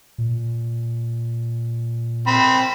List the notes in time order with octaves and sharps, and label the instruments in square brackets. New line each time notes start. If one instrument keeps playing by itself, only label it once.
[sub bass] A#2
[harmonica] C4 B5